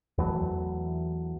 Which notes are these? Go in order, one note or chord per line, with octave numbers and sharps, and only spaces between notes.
E2 E3 F#3 A3